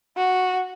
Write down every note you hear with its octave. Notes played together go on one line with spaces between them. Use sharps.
F#4